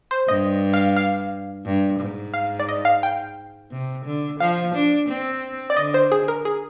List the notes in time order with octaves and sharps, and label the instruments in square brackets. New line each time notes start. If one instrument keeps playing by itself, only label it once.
[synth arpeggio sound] C5
[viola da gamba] G2 [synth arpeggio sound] D#5
[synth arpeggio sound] F5
F5
[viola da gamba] G2
G#2
[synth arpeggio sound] F5
D5
D#5
F5
G5
[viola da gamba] C3
D3
[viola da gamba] F3 [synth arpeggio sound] F5
[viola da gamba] D4
C4
[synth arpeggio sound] D5
[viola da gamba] D3 [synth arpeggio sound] D#5
[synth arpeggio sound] C5
G#4
A#4
G#4